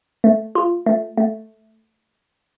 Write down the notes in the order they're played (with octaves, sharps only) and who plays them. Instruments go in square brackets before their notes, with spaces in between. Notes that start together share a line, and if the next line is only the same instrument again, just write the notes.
[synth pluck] A3
F4
A3
A3